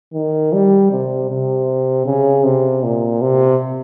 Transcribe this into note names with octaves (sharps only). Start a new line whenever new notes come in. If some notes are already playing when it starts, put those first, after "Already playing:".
D#3
G3
C3
C3
C#3
C3
A#2
C3